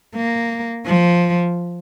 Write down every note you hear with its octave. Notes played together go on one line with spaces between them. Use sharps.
A#3
F3